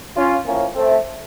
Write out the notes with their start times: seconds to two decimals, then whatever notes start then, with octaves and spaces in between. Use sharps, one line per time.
0.16 C#4 F4
0.46 A2 F3 A#3 C#4
0.75 A3 C4